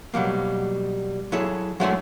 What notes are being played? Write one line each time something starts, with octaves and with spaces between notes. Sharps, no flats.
B2 F#3 G3 A#3
F#3 E4 G#4 A4
F#3 G#3 A3 D4 C5 C#5